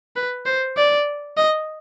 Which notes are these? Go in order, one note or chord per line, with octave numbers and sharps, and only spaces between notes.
B4
C5
D5
D#5